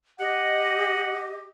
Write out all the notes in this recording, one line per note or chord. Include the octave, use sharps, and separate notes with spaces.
G4 D#5 F#5